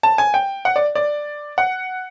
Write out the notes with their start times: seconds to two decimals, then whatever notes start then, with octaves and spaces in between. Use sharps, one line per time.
0.03 A5
0.18 G#5
0.34 G5
0.65 F#5
0.76 D5
0.95 D5
1.58 F#5